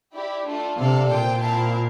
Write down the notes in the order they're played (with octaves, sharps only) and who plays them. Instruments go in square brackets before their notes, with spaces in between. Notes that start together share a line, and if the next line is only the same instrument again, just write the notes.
[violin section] E4 G4 D5
A3 D4 F4 A4
[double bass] C3 [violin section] D4 A4 D5 F5
[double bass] A#2 [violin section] F4 C5 G5
[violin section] C4 E4 A#4 F5 A5